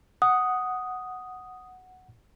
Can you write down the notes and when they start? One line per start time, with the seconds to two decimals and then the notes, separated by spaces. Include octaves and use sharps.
0.22 F#5 D#6